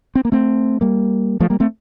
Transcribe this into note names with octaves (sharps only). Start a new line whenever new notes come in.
C4
A#3
A3 C4
G3 A#3
F3 A3
G3 A#3
A3 C4